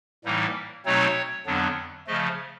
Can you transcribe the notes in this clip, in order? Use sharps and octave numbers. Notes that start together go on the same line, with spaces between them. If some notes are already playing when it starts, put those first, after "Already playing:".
A2 E3 G3 A#3 D#4
B2 F#3 A3 C4 D#4 C#5
F2 D3 F#3 B3 D4
C#3 F3 A3 D#5